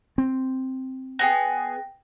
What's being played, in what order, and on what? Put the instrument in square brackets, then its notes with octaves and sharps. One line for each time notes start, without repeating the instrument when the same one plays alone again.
[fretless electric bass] C4
[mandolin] B3 G#4 [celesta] G5 A#6